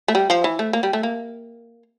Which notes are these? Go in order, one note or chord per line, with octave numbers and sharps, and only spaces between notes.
A3
G3
F3
E3
A3
A#3
G3
A3
A#3